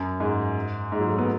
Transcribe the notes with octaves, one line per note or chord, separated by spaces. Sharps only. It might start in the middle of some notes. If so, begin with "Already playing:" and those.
Already playing: F#2
G#2
G#2
F#3
A3
B3